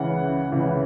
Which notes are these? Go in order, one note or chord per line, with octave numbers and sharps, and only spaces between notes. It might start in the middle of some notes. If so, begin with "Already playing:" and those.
Already playing: C#2 C#3 E3 F#5
C#2 C#3 E3